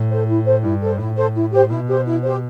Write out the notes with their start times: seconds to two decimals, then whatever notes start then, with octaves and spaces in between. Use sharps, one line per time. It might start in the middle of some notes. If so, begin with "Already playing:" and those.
Already playing: A2
0.09 A4 C5
0.27 E4
0.45 A4 C5
0.62 G2 E4
0.81 A4 C5
0.98 A2 E4
1.16 A4 C5
1.35 E4
1.52 G4 C5
1.70 B2 E4
1.87 G4 C5
2.05 E4
2.23 G4 C5